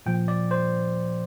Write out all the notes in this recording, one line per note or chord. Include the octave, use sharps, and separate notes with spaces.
A#2 F3 G5
D5
C5